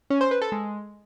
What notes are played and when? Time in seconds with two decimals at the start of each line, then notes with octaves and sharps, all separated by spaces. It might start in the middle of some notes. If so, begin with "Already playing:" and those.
0.10 C#4
0.21 C5
0.31 B4
0.41 A4
0.52 G#3